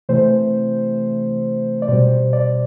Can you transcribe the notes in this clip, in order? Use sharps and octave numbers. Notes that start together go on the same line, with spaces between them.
C3 E3 A3 C5
D5
B2 G3 C5
D5